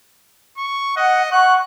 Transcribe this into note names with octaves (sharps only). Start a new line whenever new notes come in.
C#6
D#5 F#5
F#5 C#6 F#6